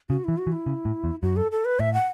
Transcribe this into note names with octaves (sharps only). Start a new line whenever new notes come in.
C#3 F#4
E3 E4
F#4
E3
E4
C#3
A2
E2
F#2 F#4
A4
A4
B4
A2 E5
F#5